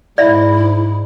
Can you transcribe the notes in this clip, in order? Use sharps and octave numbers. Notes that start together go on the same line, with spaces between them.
G#2 E4 D5 E5